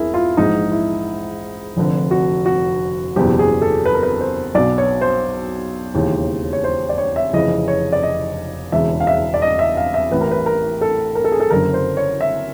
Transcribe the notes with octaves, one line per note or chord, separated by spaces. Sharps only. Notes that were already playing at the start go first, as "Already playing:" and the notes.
Already playing: E1 E4 G#4 A#4
F4
A#1 G#2 E3 D#4
E4
F1 F2 D3
F#4
F#4
F#1 E2 B2 G4
G#4
A4
B4
A#4
B4
C5
B1 B2 D5
C#5
C5
E1 D#2 C#3 E3
C#5
C5
D5
C#5
E5
F1 F2 C#3 E3 D#5
C#5
D5
D#5
E1 E2 C#3 E5
F5
E5
D5
D#5
E5
F5
E5
A1 A2 E3 B4
A#4
B4
A#4
A4
A#4
A4
G#4
A4
F#1 F#2 D3 A#4
C5
C#5
E5